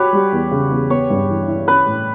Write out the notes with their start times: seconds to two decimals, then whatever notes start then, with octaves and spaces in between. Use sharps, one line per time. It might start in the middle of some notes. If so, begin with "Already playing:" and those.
Already playing: F#4 G4 B4 C#5
0.13 G3
0.33 E2
0.51 C#3
0.70 E2
0.90 B3 C#5
1.10 G2
1.29 E3
1.48 E4
1.67 C#4 B4
1.86 A2